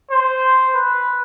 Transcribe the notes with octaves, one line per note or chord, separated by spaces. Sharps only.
C5
B4